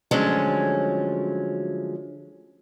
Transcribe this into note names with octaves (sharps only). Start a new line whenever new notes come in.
D3 F3 F#3 G#3 A3 C#4